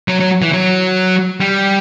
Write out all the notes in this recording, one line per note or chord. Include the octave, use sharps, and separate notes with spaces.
F#3
F#3
E3
F#3
G3